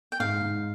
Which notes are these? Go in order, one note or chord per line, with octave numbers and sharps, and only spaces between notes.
G5
G#2 F5
G#2